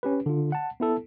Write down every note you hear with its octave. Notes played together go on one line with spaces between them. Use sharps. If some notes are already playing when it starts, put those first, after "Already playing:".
C#4 G4 B4
D3 F4
F#5 A5
B3 E4 A4